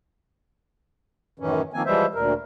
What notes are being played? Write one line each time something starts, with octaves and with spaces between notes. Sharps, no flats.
F#2 A2 D#3 E3 C#4
D#3 F3 A#3 C4 G#5
E3 F3 G3 G#3 C5 E5
D2 A#2 A#4